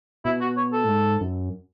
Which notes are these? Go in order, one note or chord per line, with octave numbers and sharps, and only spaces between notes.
B2 E4
F#4
C#5
A4
A2
G#2
F#2